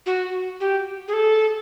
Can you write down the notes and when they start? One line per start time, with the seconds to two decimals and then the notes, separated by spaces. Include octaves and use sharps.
0.06 F#4
0.60 G4
1.08 G#4
1.13 A4